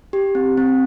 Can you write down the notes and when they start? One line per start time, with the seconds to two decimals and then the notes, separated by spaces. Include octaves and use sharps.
0.13 G4
0.35 C4
0.58 C4